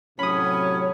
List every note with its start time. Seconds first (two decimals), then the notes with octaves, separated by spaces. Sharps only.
0.19 A2 C3 F#3 C#4 C#5 B5 D#6